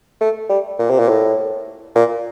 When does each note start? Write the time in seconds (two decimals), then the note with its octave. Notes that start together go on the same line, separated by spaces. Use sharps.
0.21 A3
0.49 G3
0.79 A#2
0.90 C3
0.99 A#2
1.08 A2
1.95 A#2